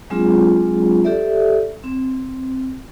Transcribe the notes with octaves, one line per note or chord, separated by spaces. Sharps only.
F#3 G#3 C4 D4 F4 G#4
G4 A4 D5 E5
C4